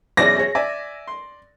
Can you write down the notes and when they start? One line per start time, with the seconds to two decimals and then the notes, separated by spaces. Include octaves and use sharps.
0.17 F#2 B2 E3 G#4 C#5 D5 A#6
0.37 G#4 C#5
0.55 D5 E5 G#5
1.08 C6